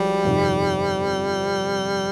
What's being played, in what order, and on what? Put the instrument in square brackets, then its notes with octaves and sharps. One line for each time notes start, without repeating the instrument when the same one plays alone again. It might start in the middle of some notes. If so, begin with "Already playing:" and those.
Already playing: [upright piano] B1 F3 G#3 [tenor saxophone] G3
[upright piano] G1 F2 C3 D#3